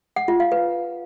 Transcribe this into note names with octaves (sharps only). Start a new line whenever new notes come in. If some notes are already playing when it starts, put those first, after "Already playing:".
F#5
F4
F5
B4